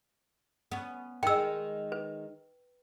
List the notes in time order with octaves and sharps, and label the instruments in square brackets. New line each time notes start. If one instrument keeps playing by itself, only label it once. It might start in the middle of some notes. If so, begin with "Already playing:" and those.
[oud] B3 C#4
[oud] D#3 G#3 [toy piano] G5 E6
[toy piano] B4